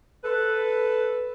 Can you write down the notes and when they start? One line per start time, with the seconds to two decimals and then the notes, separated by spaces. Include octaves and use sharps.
0.24 A4 B4